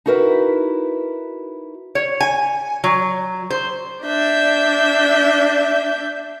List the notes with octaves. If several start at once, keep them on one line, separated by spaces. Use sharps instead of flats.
D#4 E4 F#4 A#4 B4
C#5
G#5
F#3
C5
D4 E5 G6